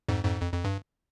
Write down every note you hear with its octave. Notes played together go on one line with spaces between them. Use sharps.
F2 G#2
F2 G#2
F2
F2
G2